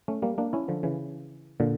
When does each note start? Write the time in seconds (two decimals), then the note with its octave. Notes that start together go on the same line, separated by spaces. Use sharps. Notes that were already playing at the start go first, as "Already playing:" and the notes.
0.08 A3 C#4
0.22 G3 A#3
0.38 A#3 D4
0.53 C#4 E4
0.68 D3 F3
0.83 C#3 E3
1.60 A#2 D3